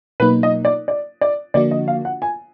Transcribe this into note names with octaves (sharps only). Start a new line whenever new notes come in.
B2 F#3 A#3 D#4 B4
D#5
D5
D5
D5
D3 F3 A#3 D4 F#4 D5
D#5
F5
F#5
G#5